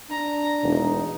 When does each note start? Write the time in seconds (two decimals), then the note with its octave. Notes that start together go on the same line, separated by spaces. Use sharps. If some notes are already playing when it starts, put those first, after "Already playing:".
0.11 D4 A#5
0.64 E1 E3 A3 D#4